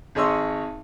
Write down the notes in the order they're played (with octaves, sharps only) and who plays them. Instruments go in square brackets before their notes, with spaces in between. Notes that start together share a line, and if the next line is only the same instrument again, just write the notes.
[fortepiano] G#1 G#4 C#5 D#5 C6 E6